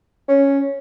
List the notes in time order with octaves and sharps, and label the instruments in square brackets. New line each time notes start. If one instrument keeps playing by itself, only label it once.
[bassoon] C#4